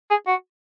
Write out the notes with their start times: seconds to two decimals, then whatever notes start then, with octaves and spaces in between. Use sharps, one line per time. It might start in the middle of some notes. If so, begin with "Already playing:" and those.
0.11 G#4
0.27 F#4